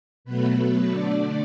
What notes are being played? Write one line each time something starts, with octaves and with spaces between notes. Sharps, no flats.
B2 F#3 A3 B3 B4
D3 A3 D4 D5